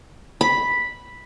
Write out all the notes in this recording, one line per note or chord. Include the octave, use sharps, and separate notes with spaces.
B5